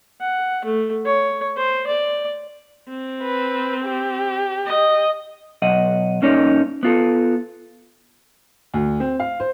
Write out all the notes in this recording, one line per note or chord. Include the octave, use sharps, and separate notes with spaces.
F#5
A3
C#5
C5
D5
C4
B4
G4
D#5
B1 D#5 F#5
G2 A#3 C#4 D#4 C#5 D5
B3 F4 A4
D2
C4
F5
C5